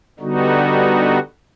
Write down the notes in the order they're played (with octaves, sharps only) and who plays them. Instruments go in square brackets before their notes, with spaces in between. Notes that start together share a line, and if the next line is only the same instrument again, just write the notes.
[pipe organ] D3 G3 B3 D#4 F#4